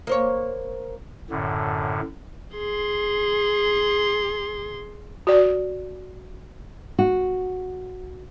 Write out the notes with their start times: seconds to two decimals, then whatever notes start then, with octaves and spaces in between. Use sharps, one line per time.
0.07 A#3 C5 C#5
1.30 F#2 A2 D3
2.55 G#4 C6
5.27 F#4 D5
6.99 F#4